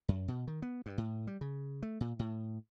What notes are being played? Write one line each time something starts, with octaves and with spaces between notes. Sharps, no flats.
F#2
B2
D#3
B3
G2
A2
G3
C#3
A3
A#2
A2